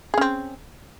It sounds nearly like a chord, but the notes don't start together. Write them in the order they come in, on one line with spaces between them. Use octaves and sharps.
G#4 C#4 C4